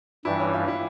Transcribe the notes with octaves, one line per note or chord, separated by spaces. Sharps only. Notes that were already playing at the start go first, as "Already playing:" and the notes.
G2 E3 G3 E4
C#4
F4
E4